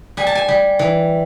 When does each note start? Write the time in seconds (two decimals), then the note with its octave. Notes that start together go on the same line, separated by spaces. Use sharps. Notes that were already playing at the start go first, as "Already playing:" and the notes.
0.17 G3 G#5
0.27 A5
0.35 G#5
0.48 G3
0.79 E3